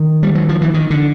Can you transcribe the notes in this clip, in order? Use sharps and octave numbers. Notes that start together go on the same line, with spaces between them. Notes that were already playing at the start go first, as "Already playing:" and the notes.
Already playing: D#3
G3
F#3
F3
E3
D#3
D3